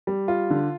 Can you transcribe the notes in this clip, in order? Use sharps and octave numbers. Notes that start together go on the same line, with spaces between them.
G3
F4
D3